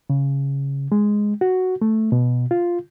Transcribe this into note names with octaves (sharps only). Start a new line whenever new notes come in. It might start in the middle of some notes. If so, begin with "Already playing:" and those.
C#3
G#3
F#4
A3
B2
F4